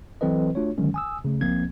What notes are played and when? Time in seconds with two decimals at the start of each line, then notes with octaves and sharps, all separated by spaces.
0.21 E3 F#3 C4 A4 B4 D#5
0.55 A3 D4 F4 F#4 C#5
0.78 D3 D#3 F#3 G#3 C#4
0.94 G#5 D#6 E6
1.24 C#3 A3
1.41 C2 F3 A#3 C4 G#6